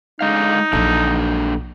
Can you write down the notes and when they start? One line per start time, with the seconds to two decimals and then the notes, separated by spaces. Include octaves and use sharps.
0.21 D3 G#3 D#4 F5
0.73 A#1 F#3 A#3 D4 A4